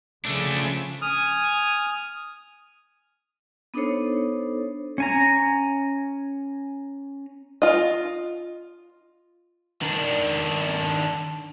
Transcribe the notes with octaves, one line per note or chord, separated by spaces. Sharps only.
C#3 F3 A3 D4
G#5 D#6 F6
B3 D4 D#4 A4 C5 C#5
C#4 G#5 A#5
F4 D#5
D#3 D4